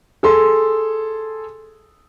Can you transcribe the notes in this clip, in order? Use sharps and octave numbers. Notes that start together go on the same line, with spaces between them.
G#4 A4 C6